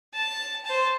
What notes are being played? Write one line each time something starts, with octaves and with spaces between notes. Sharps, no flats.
A5
C5 A5